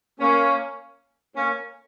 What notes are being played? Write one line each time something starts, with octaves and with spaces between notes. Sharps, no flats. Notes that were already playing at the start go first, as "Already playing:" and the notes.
A#3 C#4
A#3 C#4